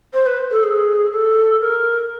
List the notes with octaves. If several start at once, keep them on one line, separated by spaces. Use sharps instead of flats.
C5
B4
A4
G#4
A4
A#4